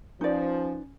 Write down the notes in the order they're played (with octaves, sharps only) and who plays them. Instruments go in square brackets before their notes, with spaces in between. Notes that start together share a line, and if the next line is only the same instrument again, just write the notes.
[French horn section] F3 [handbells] C#4 [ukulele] D#4 B4 D5